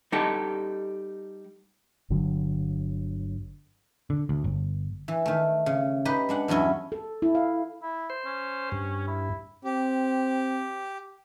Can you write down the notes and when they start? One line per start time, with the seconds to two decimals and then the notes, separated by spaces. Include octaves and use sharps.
0.12 G3 D#4 G4 A4
2.10 G1 D3 F#3
4.10 D3
4.29 D2
4.44 G1
5.08 E3
5.26 D#3 A3
5.66 C#3
6.05 D#4 G4 B4
6.29 G#3 D4 F#5
6.48 E2 G2 F#3 C#4 E4
6.92 A4
7.22 E4
7.35 F5
7.82 E4
8.10 C5
8.26 C#4
8.72 G2
9.07 E4
9.64 C4 G4